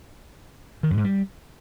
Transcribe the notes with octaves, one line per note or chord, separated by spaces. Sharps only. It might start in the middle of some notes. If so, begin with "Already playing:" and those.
D#3
F#2
G#2
G3